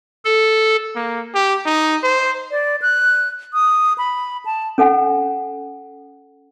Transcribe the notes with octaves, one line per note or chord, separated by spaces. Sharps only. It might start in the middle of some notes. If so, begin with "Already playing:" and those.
A4
A#3
G4
D#4
C5
D5
F#6
D#6
B5
A5
C#4 A4 F#5 G#5